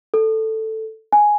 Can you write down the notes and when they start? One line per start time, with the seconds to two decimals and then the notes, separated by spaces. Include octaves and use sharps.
0.14 A4
1.13 G#5